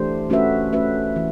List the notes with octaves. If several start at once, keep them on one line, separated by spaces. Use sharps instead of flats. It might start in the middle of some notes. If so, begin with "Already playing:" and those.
Already playing: E3 A3 D4 G4 C5
A3 C#4 F#4 B4 E5
A3 C#4 F#4 B4 E5
E3